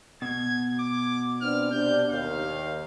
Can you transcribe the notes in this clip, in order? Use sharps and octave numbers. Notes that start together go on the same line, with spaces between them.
B2 G#6
D6
B3 C4 D4 F6
C3 D4 G6
D#2 F5